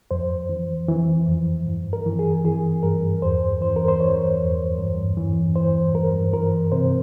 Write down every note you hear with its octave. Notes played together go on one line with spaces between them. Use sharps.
F2 C5
E3
E3
F2
G2
A#4
E3
G#4
E3 G#4
G2 A#4
E2 C5
E3 C5
A#4
C5
E3 C#5
E2
G2
E3
E3 C5
G2 A#4
E3 A#4
C3 C5